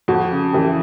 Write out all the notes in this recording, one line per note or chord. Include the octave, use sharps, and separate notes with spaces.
F2 F#4
C#3
E3 G4